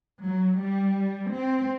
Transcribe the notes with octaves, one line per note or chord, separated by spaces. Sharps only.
F#3
G3
C4